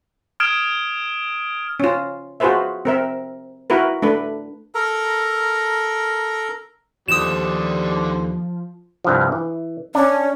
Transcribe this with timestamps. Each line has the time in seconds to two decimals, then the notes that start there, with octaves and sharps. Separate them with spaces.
0.40 D#6 F6 G#6 D7 E7
1.80 C#4 F4
2.40 F4 F#4 G#4 B4 C5 E5
2.85 C4 A#4 E5
3.70 E4 F#4 A#4 B4
4.02 A3 D4 B4
4.75 A4 A#4 A#5
7.08 D#2 D3 F3 G3 C5 D#6 E7
9.04 C2 G2 F3
9.32 E3
9.95 C#4 D4